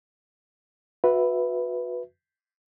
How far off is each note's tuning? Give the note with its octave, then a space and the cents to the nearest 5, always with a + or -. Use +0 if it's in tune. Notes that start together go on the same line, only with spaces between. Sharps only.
F#4 -25 B4 +0 E5 +0